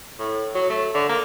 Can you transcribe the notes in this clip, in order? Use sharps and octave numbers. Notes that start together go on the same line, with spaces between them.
A2
F#3
A3
D3
A#3